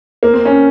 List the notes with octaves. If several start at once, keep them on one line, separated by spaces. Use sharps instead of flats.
A#3
C4
C#4